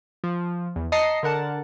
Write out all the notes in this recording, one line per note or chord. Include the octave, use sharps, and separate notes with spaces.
F3
E2
D#5 A5 A#5 C7 C#7
D3 A#4 F#5 A5